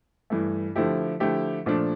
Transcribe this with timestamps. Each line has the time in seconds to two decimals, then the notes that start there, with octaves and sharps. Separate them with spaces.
0.30 G2 E3 A3
0.75 D3 F3 A3 E4 G4
1.20 D3 F3 A3 E4 G4
1.66 A#2 F3 A3 D4